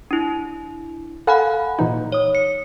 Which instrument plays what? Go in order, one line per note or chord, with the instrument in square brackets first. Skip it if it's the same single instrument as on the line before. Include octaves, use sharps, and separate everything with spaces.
[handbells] D4 E4
[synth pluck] A4 F5 G#5 [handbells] F#5 B5 F#6
[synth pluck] A#2 E3 D#4
[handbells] C#5 D#6
C#7